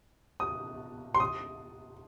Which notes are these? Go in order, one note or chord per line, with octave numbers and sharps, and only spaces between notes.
D#6
C6
D#6